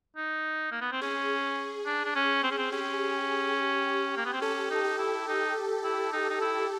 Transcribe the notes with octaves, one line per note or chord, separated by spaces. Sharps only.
D#4
A#3
B3
C4
C#4 G#4
D4
D4
C#4
C4
C#4
C4
C#4 G4
A#3
B3
C4
C#4 A4
D#4
G4
E4
D#4
E4
D#4
D#4
E4